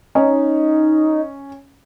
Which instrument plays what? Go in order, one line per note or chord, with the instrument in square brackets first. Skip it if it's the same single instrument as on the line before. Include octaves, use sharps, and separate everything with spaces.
[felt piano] C#4 [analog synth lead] D#4